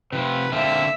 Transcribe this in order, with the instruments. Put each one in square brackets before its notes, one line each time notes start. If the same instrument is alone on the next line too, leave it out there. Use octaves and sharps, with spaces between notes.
[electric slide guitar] C3 F3 [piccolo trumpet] B4
[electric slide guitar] D3 A#3 C4 [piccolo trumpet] E5